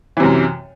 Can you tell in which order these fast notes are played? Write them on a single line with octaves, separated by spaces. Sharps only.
E3 C3 F#2